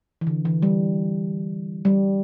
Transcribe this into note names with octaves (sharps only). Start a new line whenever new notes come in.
E3
D3
E3
G3
G3